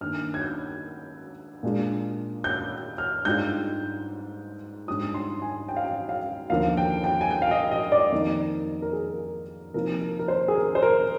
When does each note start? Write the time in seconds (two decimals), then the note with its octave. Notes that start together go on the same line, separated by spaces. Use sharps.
0.01 G2 D#3 A#3 F6
0.34 G#6
0.42 G6
1.63 A#2 G#3 D4 F4
2.44 G6
2.98 F6
3.25 G#2 G3 D4 F4 G6
4.88 G#2 G3 D4 F4 D#6
5.14 C6
5.42 G#5
5.69 G5
5.76 F5
5.84 G5
6.09 F5
6.50 D#2 D3 F3 A#3 F5
6.77 G5
7.04 G5
7.21 G#5
7.31 G5
7.42 F5
7.51 D#5
7.71 D#5
7.92 D5
8.12 F2 D#3 A#3 D#4
8.82 A#4
8.93 G#4
9.74 C3 F3 A#3 D#4 A#4
10.01 A#4
10.19 A#4
10.28 C5
10.48 G#4
10.55 A#4
10.75 C5
10.83 A#4